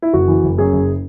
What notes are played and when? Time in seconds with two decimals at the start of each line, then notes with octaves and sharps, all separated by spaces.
0.02 E4
0.13 F#1 F#4
0.28 E3
0.44 F#1
0.58 F#2 G#4
0.72 F#1